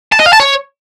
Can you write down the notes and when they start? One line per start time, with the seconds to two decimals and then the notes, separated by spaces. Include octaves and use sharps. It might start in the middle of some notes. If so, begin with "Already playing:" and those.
0.12 A5
0.19 D#5
0.26 F5
0.33 A5
0.40 C#5